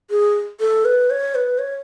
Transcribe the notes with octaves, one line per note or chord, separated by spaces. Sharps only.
G#4
A4
B4
C#5
B4
C#5